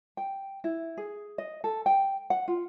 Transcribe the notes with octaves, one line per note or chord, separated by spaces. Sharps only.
G5
E4
G#4
D#5
A4
G5
F#5
F4